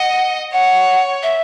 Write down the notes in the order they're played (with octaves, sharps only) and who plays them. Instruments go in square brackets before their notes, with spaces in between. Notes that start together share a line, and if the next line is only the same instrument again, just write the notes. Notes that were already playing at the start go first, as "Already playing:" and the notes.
Already playing: [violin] D#5 [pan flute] F#5
[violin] C#5 [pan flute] F#5
[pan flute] E5